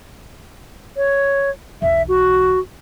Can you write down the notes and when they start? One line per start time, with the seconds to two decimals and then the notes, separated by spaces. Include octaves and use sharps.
0.97 C#5
1.82 B1 E2 E5
2.08 F#4